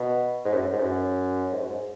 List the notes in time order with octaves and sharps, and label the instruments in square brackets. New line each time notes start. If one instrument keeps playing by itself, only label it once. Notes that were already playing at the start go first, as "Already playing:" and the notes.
Already playing: [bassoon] B2
G#2
F#2
G#2
F#2
G#2
F#2
G#2